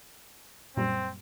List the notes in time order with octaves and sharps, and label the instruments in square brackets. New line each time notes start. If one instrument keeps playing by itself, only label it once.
[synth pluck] F#2 A#2 G3 [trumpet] C4